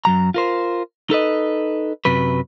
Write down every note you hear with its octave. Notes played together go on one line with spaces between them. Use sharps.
F#2 F#3 A#5
F4 A#4 C5
D#4 A4 B4 D#5
F#2 C3 F#3 B4